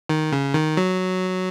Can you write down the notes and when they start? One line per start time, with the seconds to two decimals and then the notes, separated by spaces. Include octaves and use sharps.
0.09 D#3
0.32 C#3
0.54 D#3
0.77 F#3